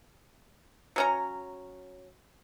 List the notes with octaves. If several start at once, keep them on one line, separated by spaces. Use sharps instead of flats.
F#3 C#4 A#5